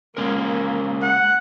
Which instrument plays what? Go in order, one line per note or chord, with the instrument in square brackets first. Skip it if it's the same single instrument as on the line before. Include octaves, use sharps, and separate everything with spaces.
[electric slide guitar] G#3 C#4 A#4 [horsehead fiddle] A#3
[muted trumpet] F#5